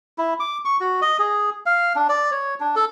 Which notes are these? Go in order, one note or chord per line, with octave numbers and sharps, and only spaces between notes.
E4
D6
C#6
F#4
D#5
G#4
F5
D4
D5
C#5
D4
A4